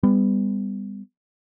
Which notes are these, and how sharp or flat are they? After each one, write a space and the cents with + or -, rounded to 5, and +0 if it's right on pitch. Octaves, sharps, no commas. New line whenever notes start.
G3 +25 B3 +20